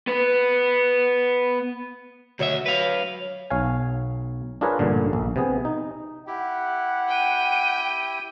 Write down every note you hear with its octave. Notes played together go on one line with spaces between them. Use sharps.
B3 B4
D2 F#3 C#5 D#5 E5
B4 F5
B1 C#5 F5 G#5
D4 F4 G#4 A#4 B4 C#5
A1 G2 A#2 D3
A#1
C3 B3 G#4
D#4
E4 G4 F#5
G5 D#7